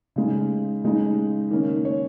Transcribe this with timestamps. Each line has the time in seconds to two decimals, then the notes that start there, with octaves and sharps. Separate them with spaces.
0.16 C#3 G#3 D#4
0.84 C#3 G#3 D#4
1.51 D#3 A#3 C#4
1.85 C#5